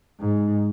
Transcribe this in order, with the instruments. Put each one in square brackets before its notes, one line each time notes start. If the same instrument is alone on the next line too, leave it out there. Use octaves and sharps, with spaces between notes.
[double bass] G#2